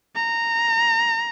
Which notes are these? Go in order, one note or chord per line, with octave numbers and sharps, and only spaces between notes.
A#5